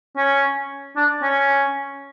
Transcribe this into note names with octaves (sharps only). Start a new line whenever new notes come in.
C#4
D4
C#4